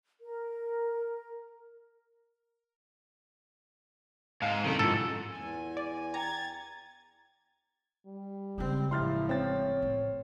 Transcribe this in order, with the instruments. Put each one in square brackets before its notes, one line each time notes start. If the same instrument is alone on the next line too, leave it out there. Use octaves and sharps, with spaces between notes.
[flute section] A#4
[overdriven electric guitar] G#2 G#3 [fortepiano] F5
[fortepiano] C2 F#2 A4 [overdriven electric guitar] D#3 B3
[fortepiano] A1 F3 [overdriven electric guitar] G#2 [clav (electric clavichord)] A4
[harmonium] E2 G#5
[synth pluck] D5
[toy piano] E4 G5 D6 [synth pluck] A#5 [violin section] G#6 A6
[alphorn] G3
[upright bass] C#3 G#3 [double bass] C4
[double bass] A1 F3 [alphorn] E4 [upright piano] C6 F6 A6
[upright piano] C4 A6 [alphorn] C#5
[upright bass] A2